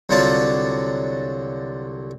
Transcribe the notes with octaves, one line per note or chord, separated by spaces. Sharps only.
C2 D3 F#3 F4 D5 A5